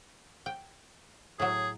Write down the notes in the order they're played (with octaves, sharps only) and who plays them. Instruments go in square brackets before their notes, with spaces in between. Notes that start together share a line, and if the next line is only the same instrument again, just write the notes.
[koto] G5
[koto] A2 F#3 [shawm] G#4